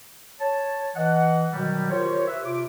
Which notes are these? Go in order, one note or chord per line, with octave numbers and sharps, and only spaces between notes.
C#5 A5
E3 D#5 F#5
B2 D#3 F#3 G3
F4 G4 A#4 C5 C#5
G4 B4 E5
C3 F4 D6